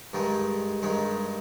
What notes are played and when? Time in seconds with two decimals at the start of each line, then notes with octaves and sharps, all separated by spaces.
0.13 G2 D#3 G#3
0.82 G2 D#3 G#3